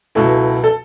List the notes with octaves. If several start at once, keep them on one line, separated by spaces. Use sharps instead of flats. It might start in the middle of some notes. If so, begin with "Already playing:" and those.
C#2 B2 F#3 E4 A4
A4